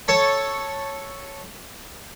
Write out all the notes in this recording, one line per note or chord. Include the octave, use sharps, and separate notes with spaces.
A4 C#5 A5